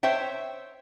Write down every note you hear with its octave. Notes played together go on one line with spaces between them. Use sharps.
C5 C#5 E5 G5